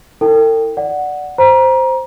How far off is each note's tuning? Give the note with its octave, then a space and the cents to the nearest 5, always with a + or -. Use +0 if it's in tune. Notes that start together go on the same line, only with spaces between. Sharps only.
E4 -30 A4 +45 G5 +0
D5 +0 F#5 +0
C5 +0 A#5 +25